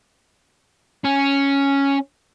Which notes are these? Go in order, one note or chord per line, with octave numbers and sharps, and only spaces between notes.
C#4